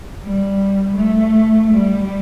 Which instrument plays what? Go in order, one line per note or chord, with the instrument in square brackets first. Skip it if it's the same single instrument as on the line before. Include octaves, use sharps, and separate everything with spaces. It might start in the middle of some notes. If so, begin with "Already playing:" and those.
[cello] G3
A3
G3